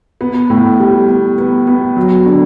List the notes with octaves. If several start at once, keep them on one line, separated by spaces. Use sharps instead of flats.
B3
A2
G3
B3
B3
B3
F#3
D3